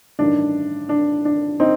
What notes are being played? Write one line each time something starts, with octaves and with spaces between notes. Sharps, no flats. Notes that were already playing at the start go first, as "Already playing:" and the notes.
A1 G2 D#3 D4
D4
D4
C4 D#4